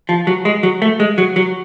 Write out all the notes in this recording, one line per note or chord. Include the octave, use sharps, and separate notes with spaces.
F3
F#3
G#3
F#3
A3
G#3
F#3
F#3